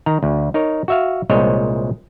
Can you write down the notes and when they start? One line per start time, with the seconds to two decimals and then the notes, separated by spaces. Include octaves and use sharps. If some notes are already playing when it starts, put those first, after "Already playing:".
0.06 D#3 A#5
0.23 D2
0.54 D#4 A#4 C#5
0.88 F#4 E5 F5
1.30 C2 A#2 G#3 C5 C#5 D#5